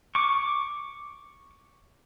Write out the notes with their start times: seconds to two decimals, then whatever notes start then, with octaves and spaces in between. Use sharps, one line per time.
0.15 C#6 D6